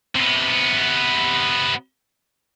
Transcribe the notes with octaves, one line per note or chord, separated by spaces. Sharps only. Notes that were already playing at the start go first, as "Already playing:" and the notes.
C3 B3